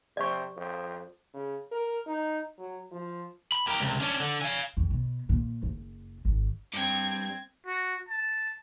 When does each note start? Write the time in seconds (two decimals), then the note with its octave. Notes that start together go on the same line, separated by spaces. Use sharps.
0.17 C3 D5 C#6
0.57 F2
1.34 C#3
1.71 A#4
2.07 D#4
2.59 F#3
2.92 F3
3.52 B5
3.67 G4 A#4
3.80 C#2 C3
4.00 C#4 D4
4.20 D3
4.42 F5 G#5
4.77 F2
4.90 B2
5.29 A#2
5.63 F#1
6.25 G#1
6.74 G2 C4 G#6
7.66 F#4
8.09 A5